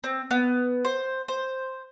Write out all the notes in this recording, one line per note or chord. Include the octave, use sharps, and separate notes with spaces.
C4
B3
C5
C5